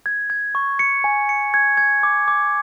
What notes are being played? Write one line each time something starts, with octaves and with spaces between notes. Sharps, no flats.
G#6
G#6
C#6
C#7
G#5
C#7
G#6
G#6
D6
D6